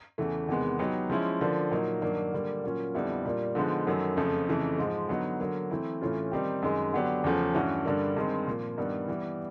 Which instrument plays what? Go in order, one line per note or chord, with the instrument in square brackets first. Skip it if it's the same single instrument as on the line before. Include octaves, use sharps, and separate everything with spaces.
[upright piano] E2 C#3 E3 A3
E2 C3 D#3 G#3 B3
F#3 B3 D#4 G4
F3 G#3 C#4 E4
D3 F3 A#3 D4
A#2 F#3 A#3 D#4
G2 D#3 F#3 A#3 D4
D3 G3 A#3
A#2 F#3 A#3 C#4 F4
F2 D3 G3 B3 E4
A#2 G3 A#3 D4
D3 F3 G#3 B3 D#4
F#2 D#3 F#3 A3
F2 C#3 F3 A3
F2 C#3 E3 A3
G#2 F3 G#3
D3 F#3 B3 D#4
D3 F#3 A#3
E3 A3 C4 E4
A2 E3 A3 C#4 F4
D#3 G3 C4 D#4 G4
F#2 D#3 G#3
D3 F#3 B3 D4 G4
E2 C#3 F3 A3 C#4
G2 E3 A3 C#4 F#4
G2 D3 G3 A#3
G2 D#3 G#3 C4
A#2 F3 A#3
G2 D#3 G3 B3
E3 G3 B3